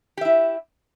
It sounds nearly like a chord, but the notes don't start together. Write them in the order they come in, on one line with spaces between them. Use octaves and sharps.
G4 E5 E4